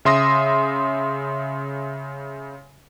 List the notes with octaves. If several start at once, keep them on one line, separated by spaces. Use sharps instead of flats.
C#3 E5 C6 D#6 A#6